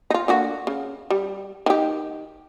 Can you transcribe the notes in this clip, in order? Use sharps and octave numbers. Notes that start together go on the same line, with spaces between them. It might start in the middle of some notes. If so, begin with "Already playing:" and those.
D#4 F4
D3 A#3 F#4
C#3
G3
D#3 G4